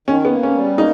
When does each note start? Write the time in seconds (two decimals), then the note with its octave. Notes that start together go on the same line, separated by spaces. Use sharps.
0.08 D#3 C#4
0.25 B3
0.32 A#3
0.43 C#4
0.55 G3
0.78 A#3 D#4